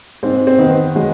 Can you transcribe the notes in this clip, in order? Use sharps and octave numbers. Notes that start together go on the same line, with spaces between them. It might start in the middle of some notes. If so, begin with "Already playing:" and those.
G#2 C4
C4
D#3 B3
F#3 G#3